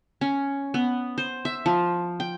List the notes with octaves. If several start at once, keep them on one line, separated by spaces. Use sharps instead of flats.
C#4
B3
C5
E5
F3
G5